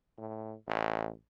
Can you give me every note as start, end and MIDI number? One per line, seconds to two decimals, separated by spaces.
0.18 0.54 45
0.68 1.10 33